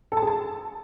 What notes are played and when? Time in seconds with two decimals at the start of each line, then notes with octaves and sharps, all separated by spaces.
0.12 A4
0.17 A5
0.22 G#4
0.27 A5